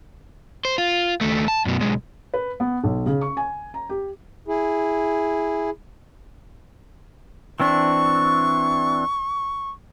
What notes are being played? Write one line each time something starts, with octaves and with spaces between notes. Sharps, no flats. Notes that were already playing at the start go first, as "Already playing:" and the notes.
C5
F4
D#2 A3
A5
F#2 B2
B1 G#3
B4
B3
B1
C#3
C#6
G#5
A#5
G4
E4 G#4
E3 C4 D4 C#6